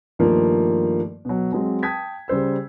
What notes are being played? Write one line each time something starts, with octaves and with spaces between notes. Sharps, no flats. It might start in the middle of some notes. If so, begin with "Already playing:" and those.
G2 D#3 F3 A3 A#3
B2 F#3
F#3 G#3 C4
G5 A5 D#6 G#6 B6
C#3 G3 C5 E6